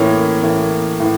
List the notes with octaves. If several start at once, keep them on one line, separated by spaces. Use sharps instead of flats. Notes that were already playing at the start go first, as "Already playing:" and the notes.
Already playing: A2 E3 A#3 C#4
A2 E3 A#3 C#4
A2 E3